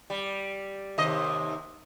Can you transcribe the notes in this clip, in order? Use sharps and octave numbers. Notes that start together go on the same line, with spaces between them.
G3
D#2 C3 D#5